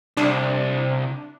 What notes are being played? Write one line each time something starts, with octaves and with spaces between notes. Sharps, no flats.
C2 D4